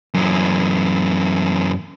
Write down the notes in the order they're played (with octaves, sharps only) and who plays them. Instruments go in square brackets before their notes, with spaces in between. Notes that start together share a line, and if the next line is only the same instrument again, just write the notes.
[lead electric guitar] F#2 E3